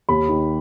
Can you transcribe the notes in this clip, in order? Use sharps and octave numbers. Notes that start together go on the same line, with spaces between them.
D#2 B5
D#3